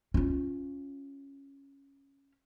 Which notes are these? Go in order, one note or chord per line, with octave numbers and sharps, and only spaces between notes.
C#4 F4